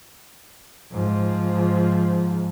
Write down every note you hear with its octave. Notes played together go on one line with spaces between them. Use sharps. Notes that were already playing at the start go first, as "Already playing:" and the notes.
G#2 F3